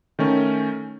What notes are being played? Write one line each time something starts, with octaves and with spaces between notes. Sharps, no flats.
D#3 A3 C#4